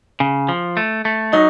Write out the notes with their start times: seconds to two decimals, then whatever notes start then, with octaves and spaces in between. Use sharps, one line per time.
0.20 C#3
0.49 F3
0.77 A3
1.05 A3
1.33 F#3 D#4